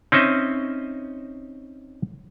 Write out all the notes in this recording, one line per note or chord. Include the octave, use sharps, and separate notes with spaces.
C4 C#4 D#4 D#5 E5